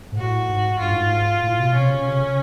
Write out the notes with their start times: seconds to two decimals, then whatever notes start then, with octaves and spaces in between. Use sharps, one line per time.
0.12 G#2
0.17 A2 F#4
0.49 G#2
0.80 G2 F4
0.91 A2
0.96 G#2
1.43 A2
1.59 B2
1.75 C3 C#4
1.94 C#3
2.06 C3
2.22 C#3